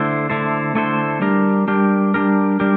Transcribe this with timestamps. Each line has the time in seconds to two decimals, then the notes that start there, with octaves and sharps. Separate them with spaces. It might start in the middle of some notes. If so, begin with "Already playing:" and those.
Already playing: D3 A3 E4 A4 C5
0.30 D3 A3 E4 A4 C5
0.75 D3 A3 E4 A4 C5
1.21 G3 D4 G4 A#4
1.68 G3 D4 G4 A#4
2.14 G3 D4 G4 A#4
2.60 G3 D4 G4 A#4